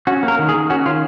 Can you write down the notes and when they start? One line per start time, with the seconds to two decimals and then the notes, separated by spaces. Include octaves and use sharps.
0.07 C#4 F#4
0.23 A#3
0.28 A#4
0.39 D#3
0.49 G#4
0.55 D#3
0.70 C#4 F#4
0.86 D#3 F4